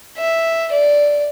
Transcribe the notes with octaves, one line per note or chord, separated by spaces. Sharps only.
E5
D5